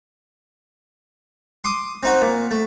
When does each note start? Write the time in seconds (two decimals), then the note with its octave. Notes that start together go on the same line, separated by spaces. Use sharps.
1.64 C6 D6 D#6
2.03 C4 D#4 F#4
2.21 A#2
2.51 A3